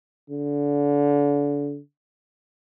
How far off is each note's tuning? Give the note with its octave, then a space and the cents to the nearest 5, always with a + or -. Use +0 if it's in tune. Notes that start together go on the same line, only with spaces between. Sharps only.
D3 -30